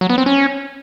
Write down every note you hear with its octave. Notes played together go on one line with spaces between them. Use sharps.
F#3
B3
C4
C#4